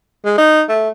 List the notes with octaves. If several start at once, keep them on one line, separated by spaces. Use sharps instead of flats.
G#3
D#4
A3